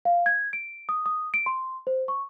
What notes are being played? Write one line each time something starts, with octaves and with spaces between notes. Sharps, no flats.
F5
G#6
D7
D#6
D#6
D7
C6
C5
C#6